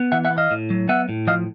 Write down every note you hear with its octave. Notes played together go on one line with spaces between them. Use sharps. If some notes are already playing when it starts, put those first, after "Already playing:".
Already playing: B3
E3 E5 F#5
E5 F#5
B3
D#5 F5
A2
F#3
B3 E5 F#5
A2
F3 D#5 F5